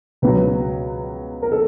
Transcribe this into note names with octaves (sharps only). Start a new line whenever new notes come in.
C#2 B2 F#3 B4
A#4
A4